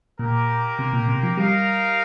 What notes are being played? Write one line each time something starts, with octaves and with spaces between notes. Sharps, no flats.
A#2 A#3 G4 A#4
C3
A#2
C3
F3
G3 D#4 A#4 F5